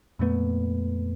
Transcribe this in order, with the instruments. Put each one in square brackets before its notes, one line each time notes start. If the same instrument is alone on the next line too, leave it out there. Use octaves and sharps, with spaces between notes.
[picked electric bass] F2 A#2 A3 B3